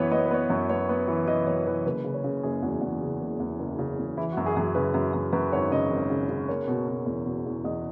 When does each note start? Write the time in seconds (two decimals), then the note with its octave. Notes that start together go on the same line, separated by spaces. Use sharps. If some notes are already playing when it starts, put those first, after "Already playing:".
Already playing: F#2 E3 B3 B4 C#5
0.11 B3 D#5
0.18 C#5
0.26 B4
0.31 B3 C#5
0.50 F#2
0.69 B3 C#5
0.89 B3
1.08 E3
1.28 E3 D#5
1.47 F#2 C#5
1.67 E3 B4
1.86 F#1 B4
2.04 C#3
2.14 C#5
2.24 C#3
2.43 F#1 G#4
2.62 E2 F#4
2.81 E2
3.01 C#3
3.21 F#1
3.40 E2
3.59 F#1
3.79 C#3
3.98 E2
4.17 E3 E4
4.32 F#4
4.37 F#2
4.46 G#4
4.56 F#2 G#4
4.75 C#3 B4
4.94 F#2
5.14 F#2
5.33 F#2 B4
5.52 G#1 C#5
5.71 C#3 D#5
5.91 G#1
6.10 C#3
6.29 C#3
6.48 A#3 C#5
6.68 B2
6.88 B2
7.06 E2
7.26 B2
7.46 E2
7.64 E2 D#5